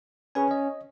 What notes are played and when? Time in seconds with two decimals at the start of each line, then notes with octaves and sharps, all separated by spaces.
0.35 C#4 G#4 B4 G#5
0.51 D#5